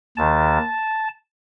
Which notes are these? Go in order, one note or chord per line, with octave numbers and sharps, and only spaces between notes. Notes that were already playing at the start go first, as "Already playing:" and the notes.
D#2 D#3 A5